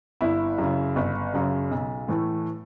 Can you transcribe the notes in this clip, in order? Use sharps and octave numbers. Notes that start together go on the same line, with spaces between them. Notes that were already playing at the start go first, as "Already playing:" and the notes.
G1 E4
F#2 C#3
G1
F#2 C#3
B1
A2 E3 A3